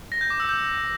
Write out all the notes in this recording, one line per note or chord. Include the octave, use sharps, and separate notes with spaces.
A#6
G6
D6
E6
G6